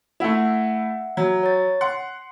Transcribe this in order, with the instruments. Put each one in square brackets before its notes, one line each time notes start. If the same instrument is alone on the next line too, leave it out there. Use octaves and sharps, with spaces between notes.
[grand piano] A3 E4 [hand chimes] E5 F#5
[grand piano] F#3
[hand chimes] C#5 A6
[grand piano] F#5 [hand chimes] C6